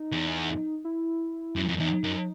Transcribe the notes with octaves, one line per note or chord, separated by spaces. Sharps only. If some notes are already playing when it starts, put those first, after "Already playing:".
Already playing: D#4
E2
E4
F#2
F2
E2 D#4
F#2